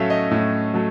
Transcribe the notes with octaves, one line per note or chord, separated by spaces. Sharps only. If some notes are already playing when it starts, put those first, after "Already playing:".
Already playing: A2 F#3 A3 C#4 E5 F5
D#5
A2
F#3 A3